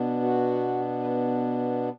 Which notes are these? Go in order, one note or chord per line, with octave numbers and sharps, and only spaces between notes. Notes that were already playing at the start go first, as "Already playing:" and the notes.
Already playing: B2 B3 D4
F#4
B4